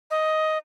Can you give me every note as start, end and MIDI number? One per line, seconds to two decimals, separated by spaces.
0.10 0.58 75